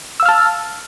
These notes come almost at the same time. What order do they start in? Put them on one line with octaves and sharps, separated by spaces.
E6 F5 F6 A5